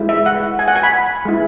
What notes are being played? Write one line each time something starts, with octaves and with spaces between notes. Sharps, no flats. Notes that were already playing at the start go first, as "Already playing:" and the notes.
Already playing: G#3 E4
E5
F#5
G#5
F#5
G#5
B5
G#3 E4